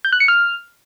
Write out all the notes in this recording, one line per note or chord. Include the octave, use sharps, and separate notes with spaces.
G6
F#6
C#7
F6